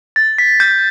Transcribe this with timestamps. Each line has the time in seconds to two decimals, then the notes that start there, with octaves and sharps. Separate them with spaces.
0.16 A6
0.38 B6
0.60 G6